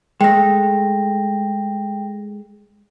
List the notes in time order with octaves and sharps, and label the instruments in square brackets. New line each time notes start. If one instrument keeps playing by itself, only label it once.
[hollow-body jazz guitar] G#3 A3 [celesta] G5 A#6